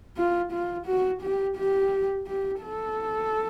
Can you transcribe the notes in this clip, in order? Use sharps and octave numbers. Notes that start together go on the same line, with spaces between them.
F4
F4
F#4
G4
G4
G4
A4